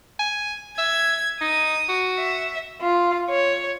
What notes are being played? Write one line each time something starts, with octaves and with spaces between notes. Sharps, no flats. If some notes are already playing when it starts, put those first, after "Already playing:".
G#5
E5 G#6
D#4 D#6
F#4
E5
F4
C#5